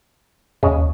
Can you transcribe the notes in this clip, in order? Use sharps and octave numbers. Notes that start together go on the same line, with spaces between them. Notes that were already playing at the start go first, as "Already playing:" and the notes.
D#2 C#3 G#3